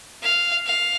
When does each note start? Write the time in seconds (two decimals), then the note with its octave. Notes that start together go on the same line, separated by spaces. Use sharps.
0.23 F5
0.67 F5